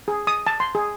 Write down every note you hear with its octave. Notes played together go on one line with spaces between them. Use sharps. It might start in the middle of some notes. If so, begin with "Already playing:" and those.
G#4
D#6
A5
C6
G#4